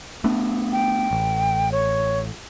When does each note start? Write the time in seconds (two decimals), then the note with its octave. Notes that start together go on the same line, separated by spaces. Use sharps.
0.24 A3 B3 D4
0.72 G5
1.11 A1
1.72 C#5